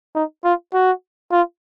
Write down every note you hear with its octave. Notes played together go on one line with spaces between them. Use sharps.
D#4
F4
F#4
F4